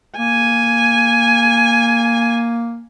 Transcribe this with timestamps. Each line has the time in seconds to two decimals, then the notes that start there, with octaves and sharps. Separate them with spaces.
0.19 A#3 G#5